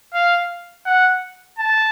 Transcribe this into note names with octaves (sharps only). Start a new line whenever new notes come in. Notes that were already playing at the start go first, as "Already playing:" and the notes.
F5
F#5
A5